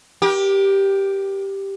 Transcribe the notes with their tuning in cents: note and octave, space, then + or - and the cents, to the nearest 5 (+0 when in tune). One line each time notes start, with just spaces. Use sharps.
G4 +0 A#4 +40